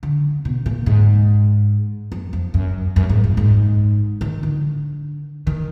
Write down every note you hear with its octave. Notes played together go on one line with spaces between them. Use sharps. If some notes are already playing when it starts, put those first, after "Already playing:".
D3
B2
A#2
G#2
F#2
F2
F#2
F#2
G#2
A#2
G#2
D#3
D3
D#3